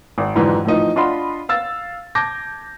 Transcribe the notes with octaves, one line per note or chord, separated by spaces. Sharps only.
G#1
F2 G#2 D3 E3 F#3
A2 E3 F3 D#4
D4 F4 D#5 F#5 B5 C6
F5 E6 A6
A5 D6 G6 G#6 A#6